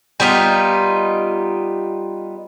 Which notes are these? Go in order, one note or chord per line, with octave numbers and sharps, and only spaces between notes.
G3 B3 D#4 F4